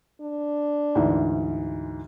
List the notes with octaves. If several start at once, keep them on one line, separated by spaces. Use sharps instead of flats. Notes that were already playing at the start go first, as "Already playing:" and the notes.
D4
D2 G#2 E3